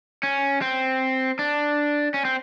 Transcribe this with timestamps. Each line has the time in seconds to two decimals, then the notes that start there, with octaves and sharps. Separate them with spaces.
0.23 C#4
0.62 C4
1.39 D4
2.14 C#4
2.25 C4